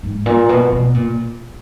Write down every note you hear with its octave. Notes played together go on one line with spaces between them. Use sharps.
G#2
A#2
B2
B2
A#2